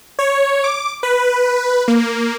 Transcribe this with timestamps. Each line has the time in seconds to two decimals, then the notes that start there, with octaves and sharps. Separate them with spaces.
0.19 C#5
0.64 D6
1.03 B4
1.88 A#3